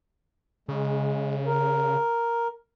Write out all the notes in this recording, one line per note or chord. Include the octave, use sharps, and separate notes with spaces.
C#3 G#3
A#4